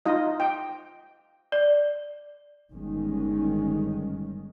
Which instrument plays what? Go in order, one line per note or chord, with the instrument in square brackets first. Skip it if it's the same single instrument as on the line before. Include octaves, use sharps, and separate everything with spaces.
[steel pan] D#4 F4 D#5
G5
[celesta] D5
[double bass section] G1 D#3 G3 G#3 C#4